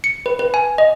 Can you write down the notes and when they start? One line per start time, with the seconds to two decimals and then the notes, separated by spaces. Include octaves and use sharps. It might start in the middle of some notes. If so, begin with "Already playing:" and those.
0.04 C#7
0.26 B4
0.39 B4
0.54 G#5
0.78 D#5